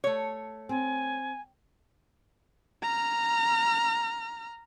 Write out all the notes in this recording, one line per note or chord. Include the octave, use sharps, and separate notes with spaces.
A3 C#5
C4 G#5
A#5 F6